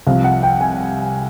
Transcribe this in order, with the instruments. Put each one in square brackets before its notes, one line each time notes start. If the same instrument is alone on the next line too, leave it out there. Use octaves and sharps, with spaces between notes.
[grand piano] C2 C3 F3 F5
F#5
G5
G#5